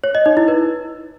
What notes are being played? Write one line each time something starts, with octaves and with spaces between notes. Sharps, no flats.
C#5
D#5
D#4
E4
B4